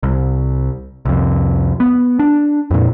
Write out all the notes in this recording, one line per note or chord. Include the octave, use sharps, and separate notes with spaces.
C2
C2 F2
B3
D4
F2 A#2